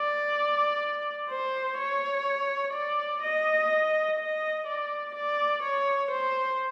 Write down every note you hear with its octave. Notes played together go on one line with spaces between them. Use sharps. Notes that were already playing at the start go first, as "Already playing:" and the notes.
Already playing: D5
C5
C#5
D5
D#5
D#5
D5
D5
C#5
C5